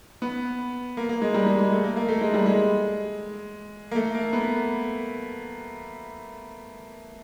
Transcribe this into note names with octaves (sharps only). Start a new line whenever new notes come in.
B3
A#3
A#3
G#3
G3
G#3
G#3
A3
A#3
A#3
A3
G#3
G3
G#3
A#3
A3
A#3
B3